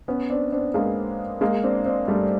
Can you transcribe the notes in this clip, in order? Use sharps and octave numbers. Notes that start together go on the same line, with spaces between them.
B3 C#4
C4 D4
C4 D4
G#3 A#3
G#3 A#3
C4 D4
C4 D4
G3 A3